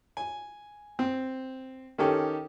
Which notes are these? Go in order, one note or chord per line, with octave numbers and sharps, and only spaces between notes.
G#5
C4
D#3 C#4 G4 A4